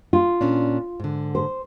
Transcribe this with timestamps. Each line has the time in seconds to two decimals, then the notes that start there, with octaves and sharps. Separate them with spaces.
0.13 F4
0.41 A#2 C#4 D4
1.00 G#2 D3
1.35 C5